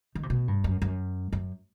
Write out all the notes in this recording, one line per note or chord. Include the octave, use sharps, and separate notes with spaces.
D#3
C3
B2
G2
F#2
F#2
F#2